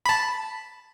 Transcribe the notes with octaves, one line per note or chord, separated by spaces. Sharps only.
A5 B5